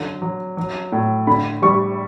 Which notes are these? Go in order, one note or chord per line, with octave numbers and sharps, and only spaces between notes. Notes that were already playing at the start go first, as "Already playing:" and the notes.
Already playing: D3 F#3
F#3
F#3
A2
D3 B5
G3 C#6